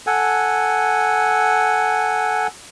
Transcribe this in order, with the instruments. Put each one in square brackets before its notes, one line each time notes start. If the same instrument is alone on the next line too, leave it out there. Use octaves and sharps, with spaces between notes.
[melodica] A4 F#5 G#5